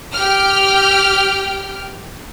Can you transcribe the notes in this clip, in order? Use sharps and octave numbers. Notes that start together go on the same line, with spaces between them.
G4 G5 F6